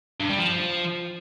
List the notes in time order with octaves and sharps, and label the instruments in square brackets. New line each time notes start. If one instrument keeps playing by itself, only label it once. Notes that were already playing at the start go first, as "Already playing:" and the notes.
[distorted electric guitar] G2
G3
F3